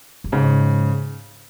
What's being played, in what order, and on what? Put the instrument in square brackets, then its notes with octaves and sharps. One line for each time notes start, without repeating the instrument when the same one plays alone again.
[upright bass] F#2
[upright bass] G#2 [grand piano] C#3